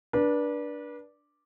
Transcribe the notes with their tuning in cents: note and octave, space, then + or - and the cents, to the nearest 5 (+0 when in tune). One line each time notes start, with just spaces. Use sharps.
D4 +0 B4 -35